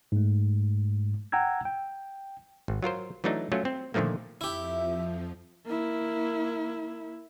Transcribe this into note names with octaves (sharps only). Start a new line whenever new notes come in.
G#2 A3
F#5 G5 A#5 E6 G#6
G5
G#1
F#3 F4 A#4 C5
E3 F#3 A3 D4 D#4
F#3 A3 C#4 F4
C4
A#2 D3 D#3 F3 A3 A#3
F2 F3 E4 G4 E5
A#3 E4